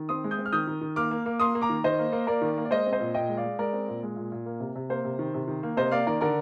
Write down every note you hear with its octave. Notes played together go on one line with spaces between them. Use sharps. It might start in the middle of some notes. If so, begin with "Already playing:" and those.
Already playing: D#3
C4 C6 D#6
G#3
D#6 G6
C4
F6
D#3 D#6 G6
D#3
D#3
A#3 D6 F6
A#3
A#3
A#3 C6 D#6
A#3
A#5 D6
D#3
D#3 C5 D#5
A#3
A#3
A#3 A#4 D5
D#3
A#3
D5
G#3 C5 D#5
C4
C5 D#5
A#2
A#2 D#5 G5
G#3
D5 F5
G#3
G#3 A#4 D5
C4
A#2
G#3
A#2
A#2
A#3
C3
C3
A#3 C5
C3
D#3
C3
D#3
A#3
C3 C5 D#5
A#3 D5 F5
D#3 A#4 D5
D3 A#4 D5